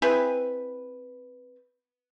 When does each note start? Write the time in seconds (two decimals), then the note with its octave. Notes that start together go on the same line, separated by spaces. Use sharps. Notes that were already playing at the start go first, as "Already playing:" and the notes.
0.02 C4 E4 G#4 B4